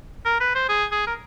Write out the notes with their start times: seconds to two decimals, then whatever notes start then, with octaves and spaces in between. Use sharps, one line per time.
0.25 A#4
0.40 B4
0.55 C5
0.69 G#4
0.92 G#4
1.07 A#4